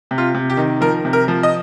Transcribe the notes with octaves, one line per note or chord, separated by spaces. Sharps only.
C3
F4
C3
G4
D#3
F3 A#4
C3
A#4
F3
D#5